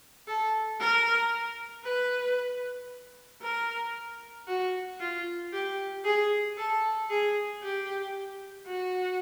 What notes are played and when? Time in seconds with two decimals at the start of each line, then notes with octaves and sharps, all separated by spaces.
0.27 A4
0.80 A#4
1.84 B4
3.42 A#4
4.48 F#4
5.00 F4
5.53 G4
6.04 G#4
6.57 A4
7.10 G#4
7.63 G4
8.67 F#4